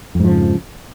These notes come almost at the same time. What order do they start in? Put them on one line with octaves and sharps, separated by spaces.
F2 G#2 F3 C#3